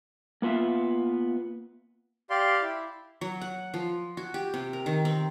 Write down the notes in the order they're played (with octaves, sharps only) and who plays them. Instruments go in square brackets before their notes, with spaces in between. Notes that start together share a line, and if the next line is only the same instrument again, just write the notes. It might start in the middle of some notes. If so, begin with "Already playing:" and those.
[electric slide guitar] A#3 B3 F4 E5 F5
[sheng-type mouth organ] G4 D5 F5 C6
E4
[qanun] F#3
F#5
F3
F#4
G4
C3
A#4
D#3
C4